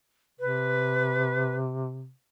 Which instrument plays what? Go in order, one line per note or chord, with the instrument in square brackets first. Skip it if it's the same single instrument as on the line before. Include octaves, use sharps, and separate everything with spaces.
[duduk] C3 [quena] B4